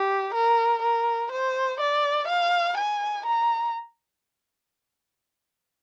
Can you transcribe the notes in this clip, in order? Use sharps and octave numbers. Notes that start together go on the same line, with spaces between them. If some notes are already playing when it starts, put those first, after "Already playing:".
Already playing: G4
A#4
A#4
C5
D5
F5
G#5
A#5